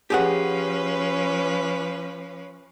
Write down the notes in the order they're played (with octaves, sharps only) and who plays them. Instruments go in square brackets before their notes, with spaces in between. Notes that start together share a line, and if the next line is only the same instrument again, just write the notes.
[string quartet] F3 C#4 B4 [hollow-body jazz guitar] G4 G#4 F#5